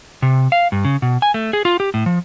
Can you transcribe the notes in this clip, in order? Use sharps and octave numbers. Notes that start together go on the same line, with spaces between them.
C3
F5
G2
C#3
B2
G#5
A3
G#4
F4
G4
A2
F3